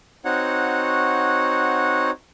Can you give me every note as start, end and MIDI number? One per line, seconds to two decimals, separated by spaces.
0.25 2.11 60
0.25 2.11 63
0.25 2.11 66
0.25 2.11 73
0.25 2.11 78